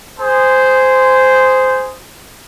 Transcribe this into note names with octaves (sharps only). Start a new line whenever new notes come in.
G#4 C5